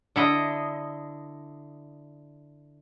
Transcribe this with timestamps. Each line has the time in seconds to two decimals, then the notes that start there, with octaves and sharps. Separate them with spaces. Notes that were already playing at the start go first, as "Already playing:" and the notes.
0.16 D3 E4 D#5